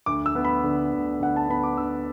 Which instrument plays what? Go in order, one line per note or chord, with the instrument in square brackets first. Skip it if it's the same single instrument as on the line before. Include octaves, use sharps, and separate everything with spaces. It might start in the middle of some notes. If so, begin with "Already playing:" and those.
[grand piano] D2 D6
E6
B3
B5
D3
D2
D2 F#5
A5
B3 B5
D6
D3 E6